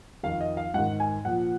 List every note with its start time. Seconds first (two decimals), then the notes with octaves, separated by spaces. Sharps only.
0.23 F2 D#3 F5
0.41 D#5
0.57 F5
0.74 G#2 D#3 F#5
1.00 G#5
1.25 A#2 F3 F#5